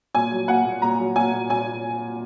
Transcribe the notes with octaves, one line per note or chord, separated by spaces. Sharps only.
A#2 G#5
F#3
A#3 F#5
A#2
A#2 A#5
F#3
A#3 G#5
A#2
A#2 G#5